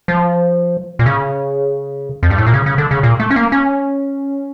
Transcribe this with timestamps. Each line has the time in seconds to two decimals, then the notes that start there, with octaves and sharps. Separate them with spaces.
0.08 F3
0.99 A#2
1.06 C#3
2.23 F2
2.30 G2
2.38 A2
2.47 A#2
2.54 C#3
2.66 C#3
2.78 D3
2.91 C#3
3.03 A#2
3.20 A3
3.30 C#4
3.36 A#3
3.52 C#4